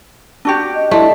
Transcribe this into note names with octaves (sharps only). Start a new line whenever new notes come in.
D4 F#4 G4
D#5
A3 E4 D5 D#5 C6